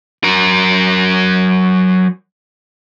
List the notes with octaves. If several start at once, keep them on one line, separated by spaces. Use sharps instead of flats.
F#3 A#4